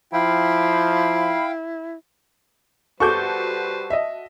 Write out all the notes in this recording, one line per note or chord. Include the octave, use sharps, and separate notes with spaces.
F3 E4 F5 G5 B5
G3 F#4 A4 B4 C5 C#6 D6 G6
D#5 E5